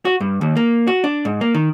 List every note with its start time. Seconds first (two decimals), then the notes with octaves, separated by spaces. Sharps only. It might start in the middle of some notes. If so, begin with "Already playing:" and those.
0.05 F#4
0.20 G2
0.41 D#2
0.57 A#3
0.87 F#4
1.04 D4
1.25 G#2
1.41 A#3
1.54 D#3